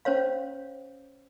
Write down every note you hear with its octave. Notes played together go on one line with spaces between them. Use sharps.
C#4 C5 C#5 F5